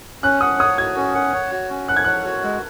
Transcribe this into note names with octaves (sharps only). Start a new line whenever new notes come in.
C#4 F#6
F#5 D#6
C#5 D#6
F#4 G#6
C#4
F#5
C#5
F#4
C#4
F#5 F#6
G#6
C#5 F#6
F#4
G#3